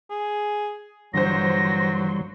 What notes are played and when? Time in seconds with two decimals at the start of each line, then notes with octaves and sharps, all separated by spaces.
0.10 G#4
1.14 G1 E3 F#3 G3 C5 C6 A#6